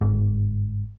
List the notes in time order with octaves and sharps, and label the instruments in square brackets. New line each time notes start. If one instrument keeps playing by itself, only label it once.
[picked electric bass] G1 G#2